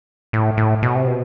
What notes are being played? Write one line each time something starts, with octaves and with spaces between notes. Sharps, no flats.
A2
A2
B2
C3
B2